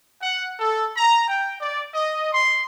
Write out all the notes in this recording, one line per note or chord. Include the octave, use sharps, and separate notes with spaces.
F#5
A4
A#5
G5
D5
D#5
C6